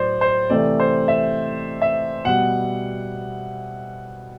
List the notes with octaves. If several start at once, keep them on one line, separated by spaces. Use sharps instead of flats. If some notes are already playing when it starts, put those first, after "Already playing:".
Already playing: A2 F#3 C5 D5
C5
C3 E3 A3 D5
C5
E5
E5
B2 G3 F#5